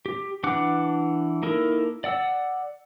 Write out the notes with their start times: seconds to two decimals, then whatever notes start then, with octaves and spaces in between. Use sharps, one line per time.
0.06 G4
0.44 E3 D4 F#5 D6 F#6
1.43 A#3 D#4 E4 A4 A#4
2.04 D5 F#5 E6